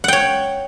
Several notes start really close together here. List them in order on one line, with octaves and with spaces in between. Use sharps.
F#5 G5 C#5